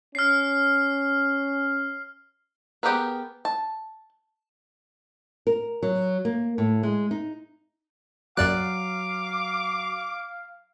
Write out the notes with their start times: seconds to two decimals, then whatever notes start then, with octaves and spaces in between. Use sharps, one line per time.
0.15 C#4 F6 C7
2.83 B3 G4 G#4 A#4 B4
3.45 A5
5.47 A#4
5.83 F#3
6.25 A#3
6.58 A2
6.83 G#3
7.11 D#4
8.37 F#2 F#3 D5 F5 D6 F#6